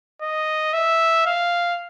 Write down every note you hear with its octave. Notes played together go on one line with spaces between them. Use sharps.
D#5
E5
F5